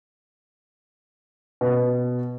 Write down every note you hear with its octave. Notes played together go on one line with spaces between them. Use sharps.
B2